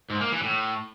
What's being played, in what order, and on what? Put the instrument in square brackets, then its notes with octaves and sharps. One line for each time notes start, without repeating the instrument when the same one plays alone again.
[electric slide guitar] G#2
A#3
E3
A2